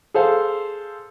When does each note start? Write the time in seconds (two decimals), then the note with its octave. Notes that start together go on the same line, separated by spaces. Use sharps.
0.14 G#4 A4 C5 F5